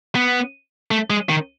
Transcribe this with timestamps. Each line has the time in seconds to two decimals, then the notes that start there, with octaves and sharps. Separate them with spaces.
0.15 B3
0.91 A3
1.10 G#3
1.29 D#3